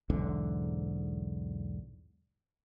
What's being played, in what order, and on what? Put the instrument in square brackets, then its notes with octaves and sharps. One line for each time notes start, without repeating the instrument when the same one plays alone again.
[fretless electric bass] B1 E2 G#2 D3